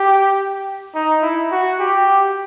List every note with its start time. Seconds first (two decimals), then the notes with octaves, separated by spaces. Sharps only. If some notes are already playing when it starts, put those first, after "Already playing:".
Already playing: G4
0.95 D#4
1.22 E4
1.51 F#4
1.79 G4